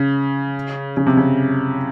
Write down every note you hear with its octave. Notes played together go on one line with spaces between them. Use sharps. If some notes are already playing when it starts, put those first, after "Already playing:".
Already playing: C#3
C#3
C3
C#3